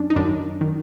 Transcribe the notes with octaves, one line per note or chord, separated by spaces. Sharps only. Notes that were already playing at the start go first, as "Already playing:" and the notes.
Already playing: F#2 C#4 D4
D#4
G1 F#2 D#3 D4
D#3